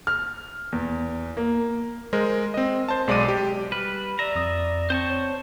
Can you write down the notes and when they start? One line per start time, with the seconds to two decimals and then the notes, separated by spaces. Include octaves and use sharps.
0.07 F6
0.72 E2
1.37 A#3
2.13 G#3 A#4 C5
2.54 C4 D#5
2.89 C5 A5
3.08 B1 G#3 D5 D6 D#7
3.28 G4
3.72 G3 B4 F6
4.19 D5 E5 A#5
4.35 F2 D#6
4.90 C4 C5 A5 C#6
5.09 C#5